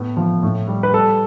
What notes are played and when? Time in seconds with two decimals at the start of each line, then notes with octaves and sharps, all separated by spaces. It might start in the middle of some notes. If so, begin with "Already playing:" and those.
Already playing: A2 B3
0.17 F3
0.43 A2
0.68 G3
0.83 B4
0.93 G3 A4